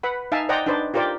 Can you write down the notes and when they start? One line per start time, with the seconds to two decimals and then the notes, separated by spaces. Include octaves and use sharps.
0.03 B4 F#5 B5
0.32 D#4 E5 F5 G#5 A5
0.49 C5 D5 D#5 F#5 G5 A#5
0.66 D4 D#4 B4 C5 D5
0.94 F4 G4 A#4 C5 D5 G5